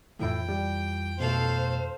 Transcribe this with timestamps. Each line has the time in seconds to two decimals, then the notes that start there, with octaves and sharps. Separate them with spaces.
0.19 F2 A2 E3 F3 E4 G5
0.49 G3
1.20 B2 A3 A4 C5 F5